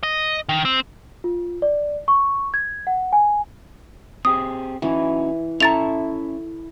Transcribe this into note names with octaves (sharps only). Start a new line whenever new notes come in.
D#5
D#3
C4
F4
D5
C#6
G#6
F#5
G#5
C4 G4 G#4 D#6
E3 C#4 D#4 F#4
C#4 E4 A4 E5 A#5 C#6 A6 F7